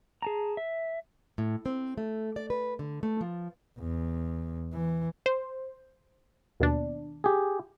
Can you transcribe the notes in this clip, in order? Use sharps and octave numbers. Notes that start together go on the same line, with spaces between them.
G#4 A5 A#5
E5
A2
C4
A3
D5
B4
D3
A3
F3
E2
E3
C5
D#2 B2 D4
G4 G#4